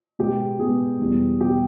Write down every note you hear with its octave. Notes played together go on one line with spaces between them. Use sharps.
B2 G#3 B3 G4
B2 G#3 B3 G#4
E2 B2 G3 B3
B2 G3 B3 G4